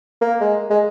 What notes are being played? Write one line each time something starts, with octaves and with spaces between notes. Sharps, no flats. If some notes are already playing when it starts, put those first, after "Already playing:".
A#3
G#3
G#3